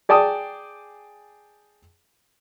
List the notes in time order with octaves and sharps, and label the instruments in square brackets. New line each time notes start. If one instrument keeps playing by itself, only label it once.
[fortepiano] G#4 D5 G5 A5 D#6